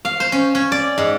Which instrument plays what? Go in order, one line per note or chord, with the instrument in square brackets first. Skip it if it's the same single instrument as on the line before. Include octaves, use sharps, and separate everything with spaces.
[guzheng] F5
C5
C#4
C#4
D5
G#2